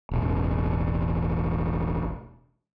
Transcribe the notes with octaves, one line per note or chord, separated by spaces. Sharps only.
E1 A1